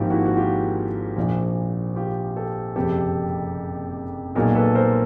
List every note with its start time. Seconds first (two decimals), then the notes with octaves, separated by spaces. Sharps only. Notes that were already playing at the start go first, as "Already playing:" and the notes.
Already playing: G#1 G#2 F3 A#3 F4 G4
0.10 E4 F#4
0.26 F#4
0.37 F4 G4
1.17 A#1 A#2 F3
1.96 F4 G4
2.36 G4 A4
2.76 F#1 F2 C3 G4 A4
4.35 B1 A#2 F#3 A#3 G#4 A#4
4.55 A4 B4
4.75 A#4 C5